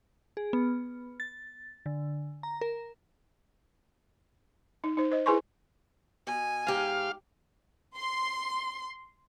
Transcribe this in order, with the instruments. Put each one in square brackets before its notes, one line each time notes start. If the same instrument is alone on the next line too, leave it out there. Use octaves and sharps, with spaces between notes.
[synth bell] G#4
B3
A6
D3
A#5
A#4
[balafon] D#4
D#4 C5
C5 D#5
E4 G#4 B4 G#5 C6 C#6
[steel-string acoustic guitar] B2 [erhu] G#5
[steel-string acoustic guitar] G#2 G4 [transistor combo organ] F5
[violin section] C6